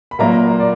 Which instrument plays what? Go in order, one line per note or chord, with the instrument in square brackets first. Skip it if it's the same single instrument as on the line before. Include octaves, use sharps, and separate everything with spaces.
[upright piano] B5
A#2 F#3 A#3 A#5
D5